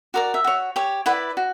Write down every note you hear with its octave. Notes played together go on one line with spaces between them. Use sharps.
F#4 A#4 D5 D6
E5
F#4 C#5
G4 C#5
E4 B4 D5 F#5
F#4